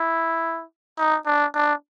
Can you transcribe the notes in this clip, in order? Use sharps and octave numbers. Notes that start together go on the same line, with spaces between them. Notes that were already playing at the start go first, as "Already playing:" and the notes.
Already playing: E4
D#4
D4
D4